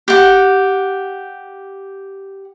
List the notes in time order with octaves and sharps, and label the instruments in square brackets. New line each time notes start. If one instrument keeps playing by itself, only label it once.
[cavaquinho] G4 F#5